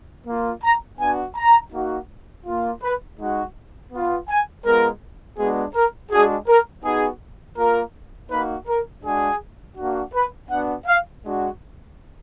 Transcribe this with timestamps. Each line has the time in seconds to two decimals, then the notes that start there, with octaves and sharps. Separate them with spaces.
0.27 A#3 F4
0.63 A#5
0.99 B3 D4 F#4 G#5
1.36 A#5
1.73 A#3 D#4 F#4
2.46 A#3 F4
2.82 B4
3.19 G#3 D#4 F#4
3.92 B3 F4
4.29 G#5
4.65 G#3 B3 F4 A#4
5.38 G#3 B3 D4 F#4 G#4
5.75 A#4
6.11 G#3 D4 F#4 G#4
6.48 A#4
6.84 B3 D#4 F#4 G#4
7.57 A#3 F4 A#4
8.30 A#3 D#4 F#4 B4
8.68 A#4
9.03 G#3 D4 F#4 G#4
9.77 A#3 D4 F#4
10.14 B4
10.50 B3 D4 F#4 F#5
10.86 F5
11.23 G#3 D4 F#4